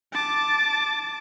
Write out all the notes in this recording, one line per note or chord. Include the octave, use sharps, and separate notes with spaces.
A5 D6